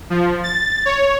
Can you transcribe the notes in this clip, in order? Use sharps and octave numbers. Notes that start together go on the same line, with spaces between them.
F3
A6
C#5